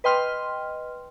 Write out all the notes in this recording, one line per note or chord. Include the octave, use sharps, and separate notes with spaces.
B4 D#5 G5 C6 F6